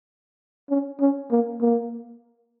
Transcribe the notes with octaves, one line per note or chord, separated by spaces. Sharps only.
C#4
C#4
A#3
A#3